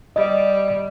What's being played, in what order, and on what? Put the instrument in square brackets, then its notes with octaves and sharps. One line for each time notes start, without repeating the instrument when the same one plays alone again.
[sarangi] G3 [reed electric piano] D#5